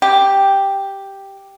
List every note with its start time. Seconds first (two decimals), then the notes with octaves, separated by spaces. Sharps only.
0.02 G4